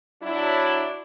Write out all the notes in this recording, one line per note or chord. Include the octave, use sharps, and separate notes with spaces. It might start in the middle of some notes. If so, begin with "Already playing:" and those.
F#3 D4 E4